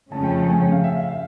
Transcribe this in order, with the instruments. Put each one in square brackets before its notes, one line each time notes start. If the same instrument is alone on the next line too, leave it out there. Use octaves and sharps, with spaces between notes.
[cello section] F2 C#3 F3 A3 C#4 [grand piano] A5
[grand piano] G5
A5
G#5
G5
F5
E5
F5
F5